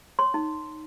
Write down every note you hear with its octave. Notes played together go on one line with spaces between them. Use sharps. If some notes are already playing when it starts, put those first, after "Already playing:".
C#5 C6
D#4